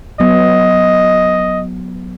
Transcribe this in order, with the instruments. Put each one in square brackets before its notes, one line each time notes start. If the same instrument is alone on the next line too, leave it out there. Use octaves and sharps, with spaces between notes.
[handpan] F#3 B3 [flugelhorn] D#5